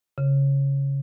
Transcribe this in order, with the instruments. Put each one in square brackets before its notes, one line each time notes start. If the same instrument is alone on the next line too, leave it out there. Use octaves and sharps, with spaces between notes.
[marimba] C#3